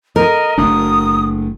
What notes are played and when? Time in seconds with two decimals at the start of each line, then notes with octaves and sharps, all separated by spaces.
0.16 A#4 D#5
0.58 F#1 A3 D4 D#6